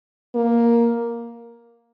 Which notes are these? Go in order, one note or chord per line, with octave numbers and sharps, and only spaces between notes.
A#3